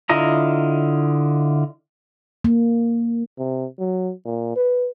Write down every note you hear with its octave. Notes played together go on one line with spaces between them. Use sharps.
D3 E4 F4 D#5 A#5
A#3
C3
F#3
A#2
B4